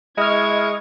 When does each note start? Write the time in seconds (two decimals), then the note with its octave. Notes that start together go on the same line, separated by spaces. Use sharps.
0.18 G#3 E4 D#5 C#6 F6 G#6